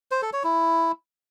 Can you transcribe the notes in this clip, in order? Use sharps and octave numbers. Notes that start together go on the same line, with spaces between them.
C5
A4
C#5
E4